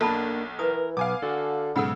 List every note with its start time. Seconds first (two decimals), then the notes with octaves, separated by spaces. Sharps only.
0.01 B1 A#3 D4 A4 A5 B5
0.59 E3 A#4 B4 D#6
0.97 B1 B3 F5 G#5 D6
1.22 D3 F#4 A4
1.76 B1 G#2 C#3 A4 F#5 B5 E6